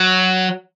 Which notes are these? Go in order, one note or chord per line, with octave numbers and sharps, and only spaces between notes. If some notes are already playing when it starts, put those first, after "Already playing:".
Already playing: F#3